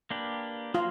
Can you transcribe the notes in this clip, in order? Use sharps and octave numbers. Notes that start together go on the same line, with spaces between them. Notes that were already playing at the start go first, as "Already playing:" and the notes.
A#3 D4 G4 B4
F#3 A#3 F4